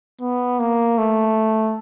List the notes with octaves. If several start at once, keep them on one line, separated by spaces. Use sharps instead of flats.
B3
A#3
A3